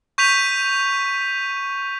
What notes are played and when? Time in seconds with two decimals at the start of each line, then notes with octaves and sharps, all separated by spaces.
0.18 C#6 G6 B6 D#7 F7